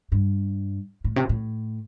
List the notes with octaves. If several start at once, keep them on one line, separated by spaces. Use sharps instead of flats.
G2
A2
C3
A2